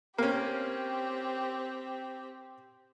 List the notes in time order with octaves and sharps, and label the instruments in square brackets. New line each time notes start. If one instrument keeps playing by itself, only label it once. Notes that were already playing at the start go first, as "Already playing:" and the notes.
[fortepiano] A#3 C#4 [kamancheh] C4 G4